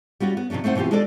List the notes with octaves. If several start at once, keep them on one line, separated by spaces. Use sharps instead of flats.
G3 C#4 F4 F#4
B3
C3 D#3 F3 C#4 D4
A3 C4 D#4 C5 F#5
B2 E3 C4 F4 G4
G#3 D4 F4 A4 D5